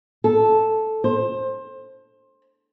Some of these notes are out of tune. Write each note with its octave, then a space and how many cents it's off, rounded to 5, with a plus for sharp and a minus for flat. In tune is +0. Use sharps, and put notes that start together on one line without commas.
A4 -5
C5 +20